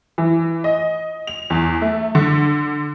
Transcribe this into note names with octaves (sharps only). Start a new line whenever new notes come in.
E3
D#5
F7
E2
A3
D3